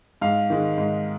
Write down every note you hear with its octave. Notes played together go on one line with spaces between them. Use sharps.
G#2 F5
D#3 G#3
G#2